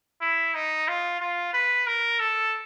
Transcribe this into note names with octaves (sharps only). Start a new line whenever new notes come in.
E4
D#4
F4
F4
B4
A#4
A4